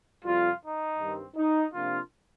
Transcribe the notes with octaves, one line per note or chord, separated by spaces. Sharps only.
F2 C3 G3 F4
D#4
G2 D#3 G3 C4
D#4
C3 F3 A#3 D4 F4